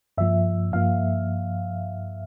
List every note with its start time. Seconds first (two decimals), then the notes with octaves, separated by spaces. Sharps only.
0.18 G2 F3 A#3 E5
0.72 G2 F3 A#3 F5